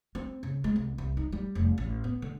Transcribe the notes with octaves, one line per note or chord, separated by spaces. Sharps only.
C4
C#3
G#3
C2
C2
D#4
G3
F1
A1
B3
D3